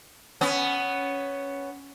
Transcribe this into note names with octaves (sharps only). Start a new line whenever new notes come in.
B3 C#4